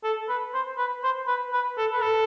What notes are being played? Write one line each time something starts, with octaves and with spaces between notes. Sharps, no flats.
A4
B4
C5
B4
C5
B4
B4
A4
B4
A4